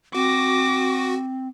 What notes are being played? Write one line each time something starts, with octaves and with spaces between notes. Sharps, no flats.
C4 F#4 D6 A#6